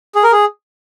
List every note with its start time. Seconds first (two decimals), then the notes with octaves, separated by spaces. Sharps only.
0.15 G#4
0.24 A#4
0.32 G#4